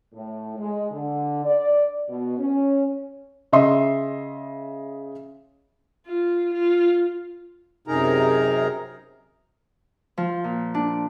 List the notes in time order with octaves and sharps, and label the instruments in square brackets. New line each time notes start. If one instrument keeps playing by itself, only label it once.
[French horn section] A2
G#3
D3
D5
B2
C#4
[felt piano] C#3 D#5 E5 C6
[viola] F4
F4
[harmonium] F#2 C3 D#4 G#4 A#4 A#5
[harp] F3
A#2
D4